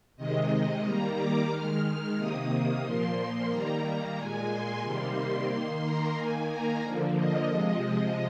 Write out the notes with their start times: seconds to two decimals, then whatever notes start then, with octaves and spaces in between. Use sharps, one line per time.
0.17 C3 D#3 G#3 D#5
0.83 D#3 G3 A#3 A#5
1.16 D6
1.50 D#3 G#3 F6
2.16 C3 D#3 A#3 D#6
2.50 D#6
2.82 A#2 F3 A#3 C6
3.49 D#3 G3 A#3 A#5
4.16 A#2 G#3 G#5
4.49 C6
4.83 C3 D#3 G3 A#3
5.15 C6
5.48 D#3 A#3
5.82 A#5
6.15 D#3 A#3 G#5
6.49 A#5
6.82 D3 F3 A#3
7.16 D#5
7.49 C3 F3 G#3